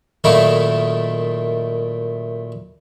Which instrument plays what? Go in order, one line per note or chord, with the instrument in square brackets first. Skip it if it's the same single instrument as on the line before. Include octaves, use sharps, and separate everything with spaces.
[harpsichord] F#2 A#2 D#3 A3 D#4 E4